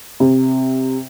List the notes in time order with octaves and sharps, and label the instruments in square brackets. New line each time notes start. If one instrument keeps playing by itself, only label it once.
[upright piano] C3